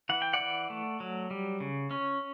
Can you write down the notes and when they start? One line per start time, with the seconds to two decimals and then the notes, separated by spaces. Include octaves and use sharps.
0.09 E3 F#5
0.22 G5
0.33 D5 F#5
0.40 E3
0.70 A3
1.00 F#3
1.31 G3
1.60 C#3
1.91 C#4